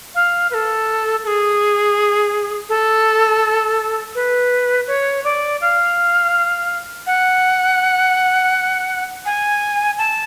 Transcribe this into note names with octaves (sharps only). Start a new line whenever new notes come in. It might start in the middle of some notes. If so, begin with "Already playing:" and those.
F5
B4
A4
A4
G#4
A4
B4
C#5
D5
F5
F#5
G#5
A5